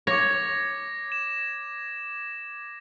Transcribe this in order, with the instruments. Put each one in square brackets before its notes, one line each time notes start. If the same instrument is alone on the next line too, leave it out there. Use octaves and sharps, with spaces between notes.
[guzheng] C#5 [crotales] D6 G#6 A#6
[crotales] E7